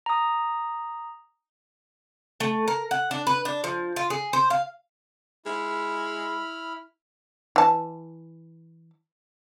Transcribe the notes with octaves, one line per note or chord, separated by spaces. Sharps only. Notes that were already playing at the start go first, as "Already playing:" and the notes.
A#5 D#6
A3
A#4
F#5
D4
B4
D4
F3
F4
G#4
C5
F5
G#3 E4 B5 F6
E3 A5